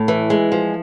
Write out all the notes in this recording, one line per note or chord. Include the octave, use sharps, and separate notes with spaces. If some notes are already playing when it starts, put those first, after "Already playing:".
Already playing: A2
E3
G#3
F3